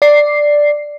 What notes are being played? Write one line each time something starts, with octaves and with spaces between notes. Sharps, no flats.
D5 C7